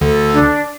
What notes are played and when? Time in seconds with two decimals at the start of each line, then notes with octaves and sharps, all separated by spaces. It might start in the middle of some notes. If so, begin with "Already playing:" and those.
0.01 D2 D3 A4
0.33 D4